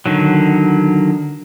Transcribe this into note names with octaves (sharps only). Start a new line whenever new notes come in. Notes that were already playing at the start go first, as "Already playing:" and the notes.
D3 D#3 F#3